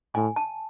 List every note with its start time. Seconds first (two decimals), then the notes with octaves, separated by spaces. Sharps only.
0.15 A2 G#5
0.36 A5